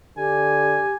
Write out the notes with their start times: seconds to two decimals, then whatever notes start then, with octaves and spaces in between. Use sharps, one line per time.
0.17 D3 G4 G#5